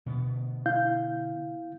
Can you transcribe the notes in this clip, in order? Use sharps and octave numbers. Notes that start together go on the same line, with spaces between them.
B2 D3 B3
E4 F5 G6